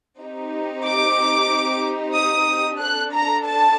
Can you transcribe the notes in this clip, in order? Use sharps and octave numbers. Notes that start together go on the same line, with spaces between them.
C4 D#4 G4
D6
D#6
D4 A4 F#6
A#5
A5